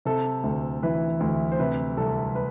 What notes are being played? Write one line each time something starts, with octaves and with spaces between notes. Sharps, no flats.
C3 A4
D2
E3 B4
D2
C5
C3 B4
C2 A4
B4